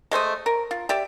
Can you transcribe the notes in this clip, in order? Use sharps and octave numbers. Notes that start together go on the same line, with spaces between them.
G#3 A3 C5 D#5
A#4
F4
G4 D5 E5